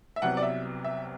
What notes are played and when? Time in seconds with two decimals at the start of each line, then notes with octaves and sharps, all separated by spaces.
0.16 E5
0.22 C2 C3 F#3 B3 F#5
0.37 D5
0.42 E5
0.84 E5